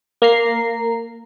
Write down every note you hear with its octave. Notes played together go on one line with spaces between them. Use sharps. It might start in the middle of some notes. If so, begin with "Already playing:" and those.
A#3 A#5 C7